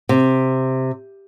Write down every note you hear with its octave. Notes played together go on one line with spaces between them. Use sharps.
C3